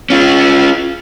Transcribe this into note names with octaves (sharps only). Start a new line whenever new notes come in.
C#4 F4